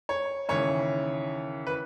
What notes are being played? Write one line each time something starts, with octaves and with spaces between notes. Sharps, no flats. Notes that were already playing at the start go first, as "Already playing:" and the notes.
C#5
D#2 C#3 E3 C#5
B4